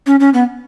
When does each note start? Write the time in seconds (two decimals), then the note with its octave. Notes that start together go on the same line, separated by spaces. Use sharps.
0.06 C#4
0.20 C#4
0.34 B3